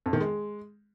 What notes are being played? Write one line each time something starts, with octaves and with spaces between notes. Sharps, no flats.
F2
D#3
G#3